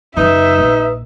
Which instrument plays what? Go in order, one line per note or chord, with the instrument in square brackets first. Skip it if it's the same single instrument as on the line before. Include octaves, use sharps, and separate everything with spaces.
[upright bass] F#2 C#3 [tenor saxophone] D#4 [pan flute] B4 [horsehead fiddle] E5
[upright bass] A#1